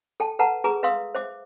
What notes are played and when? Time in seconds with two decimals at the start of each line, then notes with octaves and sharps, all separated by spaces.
0.20 A4 G5 A5
0.39 A4 B4 F#5 A5 A#5
0.64 G#4 B4 A#5 D6
0.83 B4 E5 F5 C6 D#6 E6
1.15 C5 E5 D6